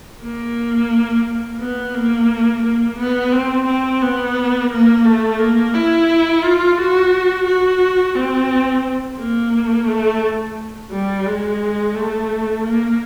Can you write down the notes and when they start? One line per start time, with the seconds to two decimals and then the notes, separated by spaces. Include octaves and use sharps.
0.22 A#3
1.60 B3
1.95 A#3
2.63 A#3
2.98 B3
3.32 C4
3.67 C4
4.01 B3
4.71 A#3
5.05 A3
5.39 A#3
5.74 E4
6.43 F4
6.78 F#4
7.47 F#4
8.15 C4
9.19 A#3
9.87 A3
10.91 G3
11.26 G#3
11.95 A3
12.64 A#3